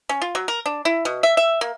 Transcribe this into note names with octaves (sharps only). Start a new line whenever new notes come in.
C#4
F4
F#3
A#4
D4
E4
B2
E5
E5
A#3